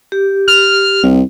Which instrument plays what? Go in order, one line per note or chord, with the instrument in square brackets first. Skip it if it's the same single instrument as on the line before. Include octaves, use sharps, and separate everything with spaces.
[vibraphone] G4
[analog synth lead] F6
[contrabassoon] C2